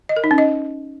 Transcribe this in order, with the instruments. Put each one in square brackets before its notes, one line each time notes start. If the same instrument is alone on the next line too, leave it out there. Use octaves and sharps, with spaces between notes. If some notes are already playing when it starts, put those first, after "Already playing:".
[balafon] D#5
A#4
D#4
C#4
D#5